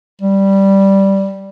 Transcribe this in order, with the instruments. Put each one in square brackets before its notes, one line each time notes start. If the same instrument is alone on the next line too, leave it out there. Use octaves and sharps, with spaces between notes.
[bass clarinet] G3